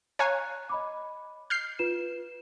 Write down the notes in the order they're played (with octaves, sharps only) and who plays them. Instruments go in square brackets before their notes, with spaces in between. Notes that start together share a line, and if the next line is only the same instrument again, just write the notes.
[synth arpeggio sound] C#5 F5 G#5 [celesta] A#5 F#6
[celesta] D#5 B5 D6
[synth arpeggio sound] F6 G6 C7
[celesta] F4 B4 E7